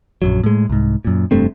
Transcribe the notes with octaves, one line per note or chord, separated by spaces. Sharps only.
A#1 F#2 F#3
A2 G#3
C2 G#2
F#2 A#2
F1 G2 A3 C4